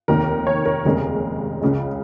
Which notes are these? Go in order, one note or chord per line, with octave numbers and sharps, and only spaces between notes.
F1 D#2 D#3 A#4
C#5
A#4
F1 D#2 C#3 G#3
C#2 C#3 G#3